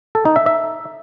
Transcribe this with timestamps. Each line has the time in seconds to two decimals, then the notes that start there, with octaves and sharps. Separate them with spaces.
0.15 A4
0.25 D#4
0.36 E5
0.46 E5